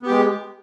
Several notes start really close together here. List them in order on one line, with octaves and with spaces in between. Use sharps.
B3 G4 G#3